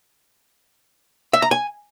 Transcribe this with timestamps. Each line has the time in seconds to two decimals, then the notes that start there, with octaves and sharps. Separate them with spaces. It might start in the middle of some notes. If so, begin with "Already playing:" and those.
1.33 E5
1.42 A#5
1.51 G#5